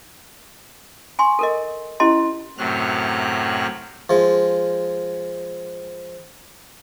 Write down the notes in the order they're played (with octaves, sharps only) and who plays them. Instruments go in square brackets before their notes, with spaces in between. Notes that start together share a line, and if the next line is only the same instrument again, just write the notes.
[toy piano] G#5 C6 C#6
A4 A#4 D#5
C#4 E4 G4 D#5 A5 C6
[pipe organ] F#2 A2 C3 F#3 F6 F#6
[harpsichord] F3 G#3